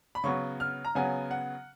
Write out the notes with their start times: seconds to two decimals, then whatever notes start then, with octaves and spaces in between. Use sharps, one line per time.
0.15 B5
0.24 C#3 F#3 B3 C#6
0.60 F6
0.85 A#5
0.95 C#3 F#3 B3 G#5
1.31 F#5